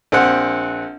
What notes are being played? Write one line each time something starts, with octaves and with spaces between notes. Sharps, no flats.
A#1 C4 F#5